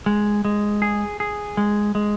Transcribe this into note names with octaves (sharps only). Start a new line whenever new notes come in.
G#3
G#3
G#4
G#4
G#3
G#3